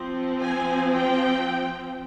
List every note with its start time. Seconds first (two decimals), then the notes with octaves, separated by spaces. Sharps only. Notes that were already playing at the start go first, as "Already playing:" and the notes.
Already playing: F3 C4
0.40 G#5
0.92 G5